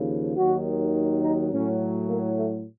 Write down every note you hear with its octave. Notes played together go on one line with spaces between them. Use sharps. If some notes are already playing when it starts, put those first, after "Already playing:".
Already playing: D#2 C#3 F3
D#2 D#3 F#3 F#4
D#4
A2 F#3 C#4
A#3
A3